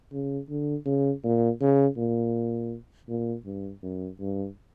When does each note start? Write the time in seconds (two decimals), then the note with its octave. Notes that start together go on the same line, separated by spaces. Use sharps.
0.13 C#3
0.50 D3
0.86 C#3
1.24 A#2
1.61 C#3
1.97 A#2
3.09 A#2
3.45 G2
3.83 F#2
4.20 G2